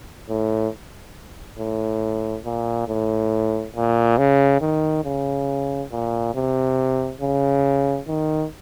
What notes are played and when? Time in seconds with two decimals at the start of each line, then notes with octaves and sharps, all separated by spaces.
0.29 A2
1.59 A2
2.45 A#2
2.88 A2
3.76 A#2
4.18 C#3
4.61 D#3
5.05 C#3
5.92 A#2
6.35 C3
7.21 C#3
8.07 D#3